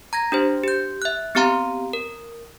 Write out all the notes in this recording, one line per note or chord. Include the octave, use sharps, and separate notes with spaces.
A#5 G#6 A#6
D4 G4 C5
G4 G6
E5 F#6
B3 C4 G4 F5 A#5 C6
A#4